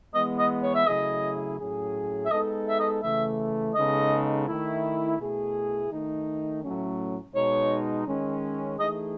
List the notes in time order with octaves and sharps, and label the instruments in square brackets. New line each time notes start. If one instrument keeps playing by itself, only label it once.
[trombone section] E3 G#3 B3 [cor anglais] D#5
[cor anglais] D#5
C#5
E5
[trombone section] C#3 F#3 A3 E4 G#4 [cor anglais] D#5
[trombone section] A2 F#3 C#4 G#4
[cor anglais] E5
[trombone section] G#3 B3 D#4 A4 [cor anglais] D#5
[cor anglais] E5
D#5
[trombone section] C#3 E3 A3 [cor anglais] E5
[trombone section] C#3 G#3 B3 D#4 A4 [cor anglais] D#5
[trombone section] D#3 A3 E4
B2 A3 E4 G#4
D#3 A3 D#4
A2 F#3 A3 C#4
[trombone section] B2 G#3 D#4 [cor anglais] C#5
[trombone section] D#3 G#3 C#4
[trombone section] E3 A3 D#4 G#4 [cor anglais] D#5